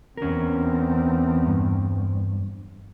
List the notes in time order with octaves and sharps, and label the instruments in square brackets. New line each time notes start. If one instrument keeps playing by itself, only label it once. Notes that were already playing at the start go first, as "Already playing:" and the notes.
[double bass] E2 C4 [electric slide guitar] C#4 A#4
[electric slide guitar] G2